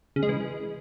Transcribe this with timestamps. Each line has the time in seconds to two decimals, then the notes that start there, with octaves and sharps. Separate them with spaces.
0.16 C#3
0.23 G#3
0.29 E3